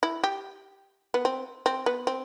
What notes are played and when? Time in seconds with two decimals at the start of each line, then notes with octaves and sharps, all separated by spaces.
0.03 E4
0.24 G4
1.14 B3
1.25 C4
1.66 C4
1.86 B3
2.07 C4